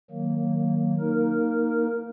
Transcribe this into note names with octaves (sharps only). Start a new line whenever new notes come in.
D#3 F#3 A#3
A#3 D#4 A#4